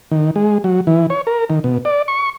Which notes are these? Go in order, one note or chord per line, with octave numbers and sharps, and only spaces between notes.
D#3
G#3
F#3
E3
C#5
A#4
D#3
B2
D5
C#6